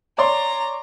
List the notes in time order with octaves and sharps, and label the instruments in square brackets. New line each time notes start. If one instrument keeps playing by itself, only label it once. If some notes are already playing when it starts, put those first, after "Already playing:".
[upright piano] C#5 D5 C6 [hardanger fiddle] A#5